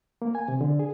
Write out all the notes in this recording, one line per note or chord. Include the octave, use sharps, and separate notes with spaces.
A#3
G#5
C3
D3
G#4